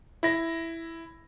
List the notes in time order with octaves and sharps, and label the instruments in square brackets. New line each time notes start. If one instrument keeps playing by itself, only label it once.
[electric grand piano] E4 A#6